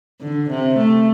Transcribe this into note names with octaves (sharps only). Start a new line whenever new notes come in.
D3
C3
A3